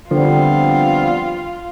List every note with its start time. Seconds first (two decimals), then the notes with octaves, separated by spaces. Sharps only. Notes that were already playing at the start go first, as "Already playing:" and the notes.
0.11 D3 F3 G3 B3 C4 F4